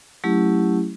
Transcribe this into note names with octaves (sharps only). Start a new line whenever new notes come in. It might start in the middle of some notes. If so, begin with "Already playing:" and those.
F#3 A3 C#4 E4 G4